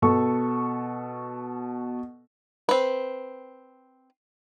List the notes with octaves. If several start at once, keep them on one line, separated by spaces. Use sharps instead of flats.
B2 A4 C#6
C4 B4